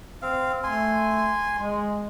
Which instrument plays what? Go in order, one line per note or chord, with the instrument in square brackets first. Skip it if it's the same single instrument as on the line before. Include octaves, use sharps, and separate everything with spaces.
[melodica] C4 F5
[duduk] A3 [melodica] G#5 C6
[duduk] G#3